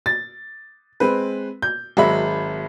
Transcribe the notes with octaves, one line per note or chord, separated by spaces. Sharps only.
A6
G#3 C4 B4
G6
G#1 F#3 G#3 F#4 E5 B5